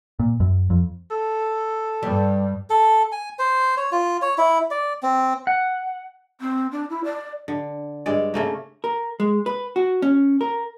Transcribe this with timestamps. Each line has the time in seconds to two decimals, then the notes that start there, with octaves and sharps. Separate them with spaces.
0.19 A#2
0.40 F#2
0.70 F2
1.11 A4
2.03 G2 G3
2.70 A4
3.12 G#5
3.39 C5
3.77 C#5
3.92 F4
4.22 C#5
4.38 E4
4.71 D5
5.03 C4
5.47 F#5
6.41 C4
6.72 D4
6.90 E4
7.04 D5
7.48 D3
8.06 G2 G#3 D5
8.34 C#3 A3 A#3
8.84 A#4
9.20 G#3
9.46 B4
9.76 F#4
10.02 C#4
10.41 A#4